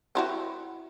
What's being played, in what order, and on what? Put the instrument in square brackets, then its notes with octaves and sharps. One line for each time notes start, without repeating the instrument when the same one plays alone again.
[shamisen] C4 E4 F#4